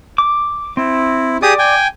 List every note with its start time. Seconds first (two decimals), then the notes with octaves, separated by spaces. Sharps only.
0.18 D6
0.77 C4 E4
1.42 G4 G#4 D5 D#6
1.59 G5 G#5